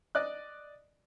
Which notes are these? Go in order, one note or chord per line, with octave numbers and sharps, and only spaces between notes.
D5 D#5 F#6